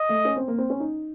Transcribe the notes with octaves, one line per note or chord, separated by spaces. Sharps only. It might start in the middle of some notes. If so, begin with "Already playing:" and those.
Already playing: D#5
A3
C#4
C4
A#3
C4
C#4
D#4